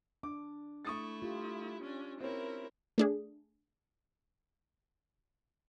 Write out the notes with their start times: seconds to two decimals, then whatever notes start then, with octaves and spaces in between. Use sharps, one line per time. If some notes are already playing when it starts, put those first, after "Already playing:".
0.23 D4 D6
0.85 A3 E4 C#6 D#6 A6
1.22 F4 G4
1.83 C#4 D4
2.20 C4 C#4 E4 A#4
2.98 A3 D4 G#4